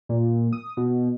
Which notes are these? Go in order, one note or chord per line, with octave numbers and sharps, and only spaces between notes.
A#2
D#6
B2